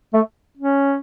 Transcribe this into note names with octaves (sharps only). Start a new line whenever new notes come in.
A3
C#4